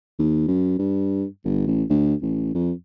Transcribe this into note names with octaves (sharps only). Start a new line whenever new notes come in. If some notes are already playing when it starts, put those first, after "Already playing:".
D#2
F#2
G2
G1
A1
D2
A1
F2